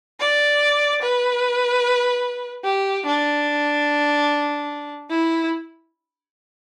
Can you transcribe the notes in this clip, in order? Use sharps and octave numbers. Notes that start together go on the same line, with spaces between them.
D5
B4
G4
D4
E4